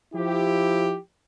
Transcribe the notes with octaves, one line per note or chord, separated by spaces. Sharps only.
F3 E4 G4